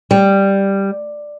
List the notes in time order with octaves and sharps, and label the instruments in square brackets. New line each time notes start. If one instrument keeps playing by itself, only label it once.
[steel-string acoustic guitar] G3